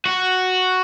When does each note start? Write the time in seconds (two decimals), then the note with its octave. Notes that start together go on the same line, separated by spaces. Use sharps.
0.06 F#4